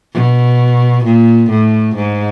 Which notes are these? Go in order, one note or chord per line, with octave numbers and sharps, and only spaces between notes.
B2
A#2
A2
G#2